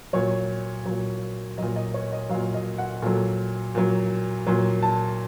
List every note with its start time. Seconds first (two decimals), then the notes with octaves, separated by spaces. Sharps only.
0.13 A#2 F#3 C#5
0.85 A#2 F#3
1.58 A#2 F#3 D#5
1.76 D#5
1.94 C#5
2.12 D#5
2.29 F#3 F5
2.34 A#2
2.54 D#5
2.78 F#5
3.02 A#2 F#3 A4
3.75 A#2 F#3
4.47 A#2 F#3
4.83 A5